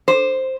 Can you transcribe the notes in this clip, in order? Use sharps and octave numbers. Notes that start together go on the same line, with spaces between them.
C5